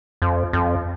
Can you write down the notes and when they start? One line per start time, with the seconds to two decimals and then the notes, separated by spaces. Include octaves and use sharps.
0.22 F2
0.53 F2